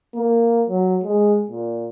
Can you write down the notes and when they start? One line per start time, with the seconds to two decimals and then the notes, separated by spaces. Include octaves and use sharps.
0.15 A#3
0.69 F#3
1.04 G#3
1.49 A#2